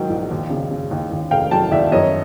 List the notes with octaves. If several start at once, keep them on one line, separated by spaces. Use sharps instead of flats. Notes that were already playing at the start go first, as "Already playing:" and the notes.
Already playing: G#2 D#3 F#3 G5
A#1
D#2
C#3
C#3
D#2
D#2
F1 F5 G5
F#3 G5 A5
D#2 D5 E5
F#2 C#5 D#5